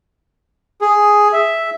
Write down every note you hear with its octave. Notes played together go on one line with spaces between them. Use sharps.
G#4
E5